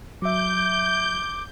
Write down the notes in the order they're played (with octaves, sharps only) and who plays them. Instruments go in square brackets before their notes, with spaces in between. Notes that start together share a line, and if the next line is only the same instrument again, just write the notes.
[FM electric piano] F#3 E5 [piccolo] D6 [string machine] G6